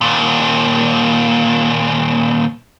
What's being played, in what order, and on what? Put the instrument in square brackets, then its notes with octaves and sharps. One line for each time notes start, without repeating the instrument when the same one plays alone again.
[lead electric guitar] D#2 A#2